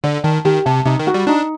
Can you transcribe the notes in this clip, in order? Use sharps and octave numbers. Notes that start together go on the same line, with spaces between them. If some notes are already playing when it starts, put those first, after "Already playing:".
D3 D5
D#3 A5
D#3 G4
C3 A5
C3 D#4
D#3
F#4
G3
D4 D#4